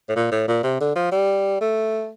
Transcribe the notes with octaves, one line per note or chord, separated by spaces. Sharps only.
A2
A#2
A2
A#2
C3
D3
F3
G3
A3